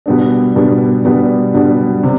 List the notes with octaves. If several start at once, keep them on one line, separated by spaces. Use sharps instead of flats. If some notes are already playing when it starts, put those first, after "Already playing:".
B2 G3 B3 D4
B2 G3 B3 D4
B2 G3 B3 D4
B2 G3 B3 D4
C3